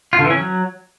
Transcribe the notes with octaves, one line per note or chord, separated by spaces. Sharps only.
F4
D3
E3
C#4
F#3